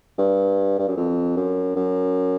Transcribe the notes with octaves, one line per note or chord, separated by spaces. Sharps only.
G2
G2
F#2
F2
F#2
F#2